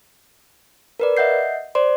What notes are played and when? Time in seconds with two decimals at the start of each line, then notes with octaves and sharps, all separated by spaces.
1.00 A#4 B4 D5
1.17 D#5 E5 F#5 G6 C7
1.75 C5 D5 C6